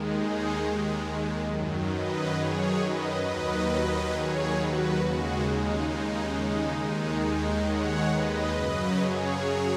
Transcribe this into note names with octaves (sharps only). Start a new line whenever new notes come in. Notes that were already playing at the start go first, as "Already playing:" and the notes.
Already playing: D#2 D#3 G#3
D#4 G#4
F#2 D#3 F#3
B4 D#5
G#4 C#5
B4 D#5
D#2 D#3 F#3 B4 D#5
G#4 C#5
F#4 B4
D#2 C#3 G#3 F#4
D#4
D#4
D#4
D#2 D#3 G#3
D#4
C#5 F#5
B4 D#5
F#2 C#3 F#3
G#4 C#5